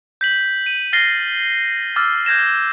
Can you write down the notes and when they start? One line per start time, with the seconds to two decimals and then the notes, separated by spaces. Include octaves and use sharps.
0.21 G6 B6 F#7
0.66 D#7
0.93 F6 A6 A#6 C7 G7
1.96 D6 E6 F6 A6
2.26 G6 G#6 A#6 E7